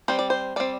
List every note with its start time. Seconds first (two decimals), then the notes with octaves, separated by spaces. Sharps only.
0.08 G3 C4 C5
0.19 D5
0.30 C5
0.56 G3 C4 D5